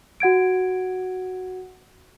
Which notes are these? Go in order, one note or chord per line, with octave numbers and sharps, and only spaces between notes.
F#4 F#5 G#6 D7